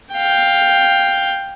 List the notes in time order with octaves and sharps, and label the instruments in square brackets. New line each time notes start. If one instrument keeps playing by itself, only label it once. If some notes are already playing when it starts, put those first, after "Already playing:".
[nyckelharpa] F5 G5